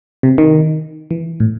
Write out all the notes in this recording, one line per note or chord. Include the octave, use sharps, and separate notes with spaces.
C3
D#3
E3
A2